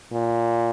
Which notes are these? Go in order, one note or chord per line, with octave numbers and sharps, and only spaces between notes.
A#2